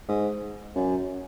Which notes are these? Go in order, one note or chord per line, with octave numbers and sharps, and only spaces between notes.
G#2
F#2